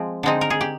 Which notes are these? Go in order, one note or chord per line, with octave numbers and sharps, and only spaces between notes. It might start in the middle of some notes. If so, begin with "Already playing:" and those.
Already playing: F3 G#3 C4
D3 G#3 C4 D#4
A#4
G#4
G4